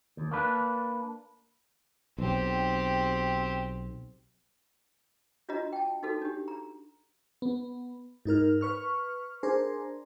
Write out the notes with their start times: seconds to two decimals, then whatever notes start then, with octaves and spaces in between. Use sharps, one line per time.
0.17 D#2
0.31 A#3 D4 B4
2.18 B1 C4 G4
5.49 D4 F4 F#4 D#5 A#5
5.73 G5 A5
6.03 D#4 F#4 A4
6.22 D4 G4
6.48 A#5
7.42 B3
8.25 G#2 D#4 A#4 F6
8.61 B4 C#6 F6
9.43 D4 G#4 A#4 C5